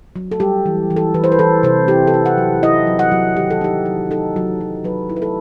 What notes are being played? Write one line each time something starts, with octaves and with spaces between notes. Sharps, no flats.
F#3
A4
G3 G4
E3
E3
A4
E3 B4
C5
B4
E3 A4
C3 C5
E4 G4
A4
E4
F#5
F#3
E4 D#5
F#3
F#5
F#3
D#3 G4
A4
D#4 G4
F#3
D#4 A4
F#3
F#3
F#3 B4
E4
B4
A4